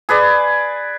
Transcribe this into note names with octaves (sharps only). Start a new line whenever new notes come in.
G#4 B4 D5